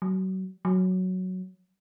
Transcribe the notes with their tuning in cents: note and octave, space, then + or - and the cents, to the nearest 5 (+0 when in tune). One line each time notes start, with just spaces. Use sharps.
F#3 +30
F#3 +0